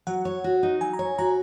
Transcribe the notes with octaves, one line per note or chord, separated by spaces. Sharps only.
F#3 F#5
C#5
F#4
D#4
F#3 G#5
A#5
C#5
F#4 A#5